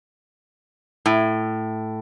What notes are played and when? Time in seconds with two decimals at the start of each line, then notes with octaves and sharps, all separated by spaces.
1.06 A2